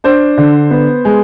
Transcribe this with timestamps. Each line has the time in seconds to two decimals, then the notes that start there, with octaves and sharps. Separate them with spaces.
0.04 D4 C5
0.37 D3
0.71 B3
1.05 G#3